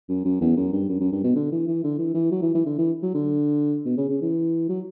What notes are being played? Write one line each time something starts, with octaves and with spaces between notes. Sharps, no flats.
F#2
F#2
E2
F#2
G2
F#2
F#2
G2
B2
D3
E3
E3
D3
E3
E3
F#3
E3
E3
D3
E3
F#3
D3
B2
C#3
C#3
E3
F#3